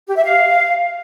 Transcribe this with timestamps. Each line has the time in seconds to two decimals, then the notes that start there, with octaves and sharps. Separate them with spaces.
0.07 G4
0.15 E5
0.24 F5